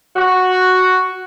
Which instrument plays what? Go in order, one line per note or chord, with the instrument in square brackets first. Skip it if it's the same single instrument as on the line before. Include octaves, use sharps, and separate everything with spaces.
[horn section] F#4